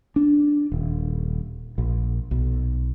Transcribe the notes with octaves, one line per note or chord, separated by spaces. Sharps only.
D4
D#1
A#1
B1